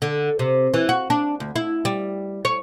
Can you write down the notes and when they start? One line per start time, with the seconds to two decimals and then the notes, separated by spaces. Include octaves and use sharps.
0.02 D3
0.39 C3
0.74 E3
0.89 F#4
1.10 D4
1.40 D2
1.56 E4
1.85 G3
2.45 C#5